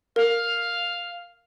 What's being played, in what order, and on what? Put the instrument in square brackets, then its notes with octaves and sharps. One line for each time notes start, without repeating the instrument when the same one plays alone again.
[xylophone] A#4 [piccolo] F5